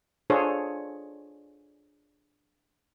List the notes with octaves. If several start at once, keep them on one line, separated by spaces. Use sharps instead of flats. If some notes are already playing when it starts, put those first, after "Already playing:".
D4 F4 G#4 A4 C5 C#5